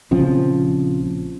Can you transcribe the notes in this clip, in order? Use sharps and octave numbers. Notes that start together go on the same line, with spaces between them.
A#1 C#3 F3 C4